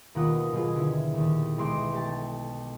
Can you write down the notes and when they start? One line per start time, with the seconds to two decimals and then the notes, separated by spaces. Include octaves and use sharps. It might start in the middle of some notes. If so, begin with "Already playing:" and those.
0.15 D#2 B2 A#3 F4 F#5 D#6
0.52 B2 F#3 D#4 F4 G#4
0.75 D3 E4
1.13 D#2 A#2
1.58 B1 G#3 E4 C6 D6
1.92 A3 G4 A5